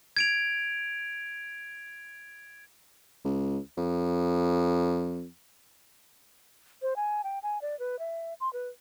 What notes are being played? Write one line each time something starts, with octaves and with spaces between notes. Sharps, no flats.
G#6 D7 F7
C#2
F2
C5
G#5
G5
G#5
D5
B4
E5
C6
B4